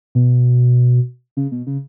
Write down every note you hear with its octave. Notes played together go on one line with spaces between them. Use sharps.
B2
C#3
B2
C#3